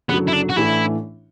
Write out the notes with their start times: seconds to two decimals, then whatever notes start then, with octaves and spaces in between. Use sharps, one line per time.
0.09 F#1 F#2 D3 F#3 B3
0.27 E4
0.33 D4
0.49 F#4
0.56 A1 A2 E3 A3 D4 E4